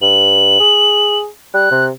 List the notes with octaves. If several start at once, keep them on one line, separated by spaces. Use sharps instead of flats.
G2 F#7
G#4
G3 F#6
C3